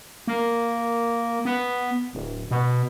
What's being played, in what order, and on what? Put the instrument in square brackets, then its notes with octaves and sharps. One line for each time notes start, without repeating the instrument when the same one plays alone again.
[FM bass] A#3
B3
D1
B2